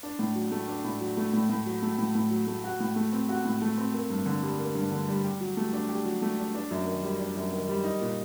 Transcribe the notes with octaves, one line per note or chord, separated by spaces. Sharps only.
D4
A2
F#3
A3
D4
A2
F#3
A3
A2
A2
F#3
A3
A2
A2
F#3
A3
F#4
A2
A3
C4
F#4
A2
A3
C4
A#3
G2
D3
G3
A#3
G2
D3
G3
G4
F#3
A3
D4
G4
F#3
A3
D4
D4
F#2
D#3
G3
D4
F#2
D#3
G3
D#4
A#2